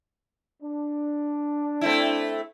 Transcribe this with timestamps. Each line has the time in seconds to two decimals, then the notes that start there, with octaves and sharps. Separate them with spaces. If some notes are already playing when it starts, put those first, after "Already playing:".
0.61 D4
1.81 A3 C4 E4